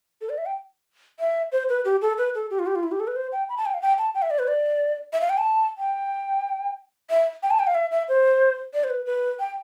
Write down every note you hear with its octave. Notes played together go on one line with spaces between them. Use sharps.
A4
D5
E5
G5
E5
C5
B4
G4
A4
B4
A4
G4
F4
G4
F4
E4
G4
A4
B4
C5
G5
B5
A5
G5
F5
G5
A5
G5
E5
D5
B4
D5
E5
F5
G5
A5
G5
E5
G5
A5
G5
F5
E5
E5
C5
D5
C5
B4
B4
G5